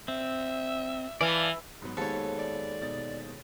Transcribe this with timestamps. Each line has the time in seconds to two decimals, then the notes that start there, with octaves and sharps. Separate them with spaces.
0.08 C4 E5
1.21 E3 D5 F5 A5
1.82 G#2 F#3 B3
1.97 D#2 G#2 B3 A4 C#5
2.38 D5
2.81 B2 D#4 A6